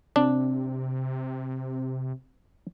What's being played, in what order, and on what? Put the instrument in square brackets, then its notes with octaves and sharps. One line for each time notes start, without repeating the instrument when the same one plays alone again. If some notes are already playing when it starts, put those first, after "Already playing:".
[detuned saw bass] C3 [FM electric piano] C4 [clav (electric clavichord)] D4